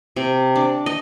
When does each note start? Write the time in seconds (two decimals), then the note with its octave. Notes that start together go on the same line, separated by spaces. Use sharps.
0.16 C3
0.56 D4
0.86 D#5